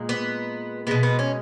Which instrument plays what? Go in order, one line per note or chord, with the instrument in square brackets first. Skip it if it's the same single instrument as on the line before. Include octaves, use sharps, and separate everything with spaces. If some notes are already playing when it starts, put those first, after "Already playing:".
Already playing: [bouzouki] A#2 G#3
B3
B2 G#3 B3
B3
C#4